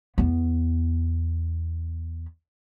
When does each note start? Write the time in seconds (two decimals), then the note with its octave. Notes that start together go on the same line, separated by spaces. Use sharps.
0.18 E2 B3